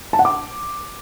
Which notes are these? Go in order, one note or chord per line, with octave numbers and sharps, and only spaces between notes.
A5
F#5
D6